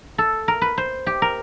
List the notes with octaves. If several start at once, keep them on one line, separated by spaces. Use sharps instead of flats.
A4
A#4
B4
C5
G4
A#4